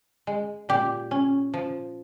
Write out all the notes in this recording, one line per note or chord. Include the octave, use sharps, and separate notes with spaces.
G#3
A#2 G4
C#4
F3